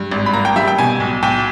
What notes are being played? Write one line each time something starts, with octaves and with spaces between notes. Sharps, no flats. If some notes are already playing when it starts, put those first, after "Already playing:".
Already playing: G2
G#1
B5
A#3 A#5
G5
G3 E5
G5
B2 G#5
B1
B1 G5